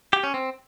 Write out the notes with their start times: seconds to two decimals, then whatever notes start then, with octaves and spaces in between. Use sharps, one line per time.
0.13 G4
0.24 C#4
0.34 C4